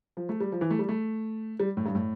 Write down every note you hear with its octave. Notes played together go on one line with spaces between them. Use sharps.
F3
A3
G3
F3
E3
A3
G3
A3
G3
A2
G2
A2